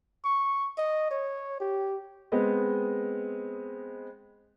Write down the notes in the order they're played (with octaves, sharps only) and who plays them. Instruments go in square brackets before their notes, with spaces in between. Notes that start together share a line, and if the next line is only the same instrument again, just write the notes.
[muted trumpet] C#6
D#5
C#5
G4
[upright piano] G#3 B3 C4 D#5